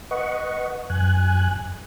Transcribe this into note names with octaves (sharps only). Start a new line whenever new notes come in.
B4 D#5 F#5 C#6
F#2 G#5 F#6